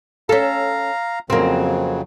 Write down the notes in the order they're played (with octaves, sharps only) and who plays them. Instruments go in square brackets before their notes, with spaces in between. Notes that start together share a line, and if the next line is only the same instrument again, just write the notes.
[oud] C#4 A4 [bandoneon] F5 A#5
[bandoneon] F2 C#3 F#3 [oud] A#3 C4